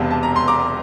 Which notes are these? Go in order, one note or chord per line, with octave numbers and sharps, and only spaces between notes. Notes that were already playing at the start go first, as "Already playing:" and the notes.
Already playing: E1 E2 C3 F5 A5
A5
A#5
C6
A#5 D6